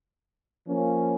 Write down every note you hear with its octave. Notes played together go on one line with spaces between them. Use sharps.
F3 A#3 C#4